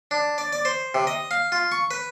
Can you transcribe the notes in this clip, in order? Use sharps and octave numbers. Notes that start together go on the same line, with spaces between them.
D4
D5
D5
C5
C3
D#5
F5
F4
C#6
B4